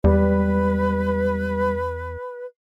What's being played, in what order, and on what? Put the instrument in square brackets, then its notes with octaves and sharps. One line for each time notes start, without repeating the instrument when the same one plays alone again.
[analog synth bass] E2 [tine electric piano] G3 [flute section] B4